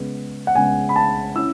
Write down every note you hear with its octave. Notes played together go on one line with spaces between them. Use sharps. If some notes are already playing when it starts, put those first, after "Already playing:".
Already playing: C#3 G#3 B3
F#5
C#3 G#3 B3 G#5
B5
A5
C#4 E4 E6